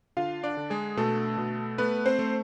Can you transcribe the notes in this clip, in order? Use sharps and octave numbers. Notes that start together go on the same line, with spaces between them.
D3 F4 F5
D4 D5
D3
G#3 G#4
B2 A3 A4
B2
A3 B3 B4
C4 C5
A3